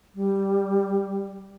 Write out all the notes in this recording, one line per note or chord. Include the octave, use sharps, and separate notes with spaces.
G3